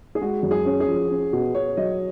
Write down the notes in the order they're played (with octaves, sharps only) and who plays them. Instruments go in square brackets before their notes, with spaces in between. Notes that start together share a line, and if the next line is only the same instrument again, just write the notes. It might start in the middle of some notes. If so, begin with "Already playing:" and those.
[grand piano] G#4
[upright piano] G#3 [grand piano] F#4
[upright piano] F#2
[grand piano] G#4
[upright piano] C#4
[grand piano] G#4
[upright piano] F3
C#4
B2
[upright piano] B2 [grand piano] C#5
[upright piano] F#3 [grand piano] D#5